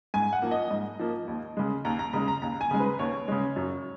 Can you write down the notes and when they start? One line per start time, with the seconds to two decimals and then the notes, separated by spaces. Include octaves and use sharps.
0.14 G#2 G#5
0.33 F#5
0.42 F3 A#3
0.51 D#5
0.70 G#2 D#5
0.99 F3 A#3
1.28 D#2
1.57 C#3 G#3
1.85 D#2 A#5
1.99 A#5
2.13 C#3 G#3 A#5
2.28 A#5
2.42 D#2 A#5
2.61 G#5
2.71 C#3 G#3
2.80 B4
2.99 D#2 C#5
3.28 C#3 G#3
3.56 F#2